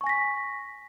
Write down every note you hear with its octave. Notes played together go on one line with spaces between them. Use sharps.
G#5 C#6 A#6 B6